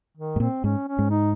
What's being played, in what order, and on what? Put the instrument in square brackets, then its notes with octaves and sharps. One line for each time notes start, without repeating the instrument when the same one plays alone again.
[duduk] D#3
[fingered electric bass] G#2
[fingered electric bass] A#2 [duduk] C4
[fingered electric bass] G#2 [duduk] C#4
[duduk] C#4
[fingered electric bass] G#2
[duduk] D#4